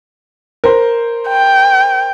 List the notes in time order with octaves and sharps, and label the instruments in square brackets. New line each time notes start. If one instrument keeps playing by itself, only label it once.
[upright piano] A#4 C5
[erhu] G5